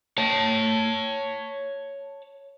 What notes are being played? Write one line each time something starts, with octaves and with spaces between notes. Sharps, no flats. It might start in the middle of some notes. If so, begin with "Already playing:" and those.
C#5 A5